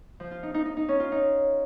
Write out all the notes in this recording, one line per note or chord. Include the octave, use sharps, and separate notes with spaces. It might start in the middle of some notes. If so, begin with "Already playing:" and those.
F3
F4
D#4
D#4
D#4
D#4
C#4
F4
D#4